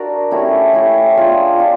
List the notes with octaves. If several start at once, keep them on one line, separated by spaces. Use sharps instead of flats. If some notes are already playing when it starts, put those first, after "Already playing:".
Already playing: D4 F#4 A#4 D5
A3 C#4 E4 G4
A3 C#4 E4 G4
D4 F4 G#4 C5
D4 F4